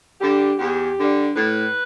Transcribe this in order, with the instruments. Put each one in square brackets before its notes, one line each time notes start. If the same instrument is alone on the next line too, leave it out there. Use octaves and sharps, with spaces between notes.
[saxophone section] D3 G3 G4
E2 G4
D3 G3
A2 B4